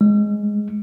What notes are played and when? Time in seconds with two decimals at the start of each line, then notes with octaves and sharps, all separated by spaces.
0.01 G#3